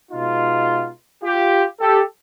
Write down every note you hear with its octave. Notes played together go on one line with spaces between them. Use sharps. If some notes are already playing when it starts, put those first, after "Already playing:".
B2 G#3 B3 D#4 F4
F4 G4
G4 A4